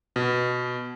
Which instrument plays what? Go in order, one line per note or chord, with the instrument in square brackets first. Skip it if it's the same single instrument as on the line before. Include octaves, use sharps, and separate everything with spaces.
[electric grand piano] B2